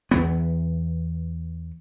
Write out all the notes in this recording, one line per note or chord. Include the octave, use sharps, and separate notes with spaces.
E2 E3 B3